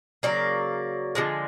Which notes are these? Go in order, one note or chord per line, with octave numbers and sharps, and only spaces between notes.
C#3 F#3 A#3 D5
D3 F3 G#3